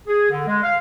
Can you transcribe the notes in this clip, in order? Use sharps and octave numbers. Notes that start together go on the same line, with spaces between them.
G#4
D3
G#3
F5